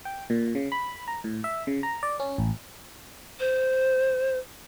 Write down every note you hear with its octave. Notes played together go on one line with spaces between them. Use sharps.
G5
A#2
C#3
B5
A#5
A2
E5
C#3
A#5
D5
C#4
A1
C5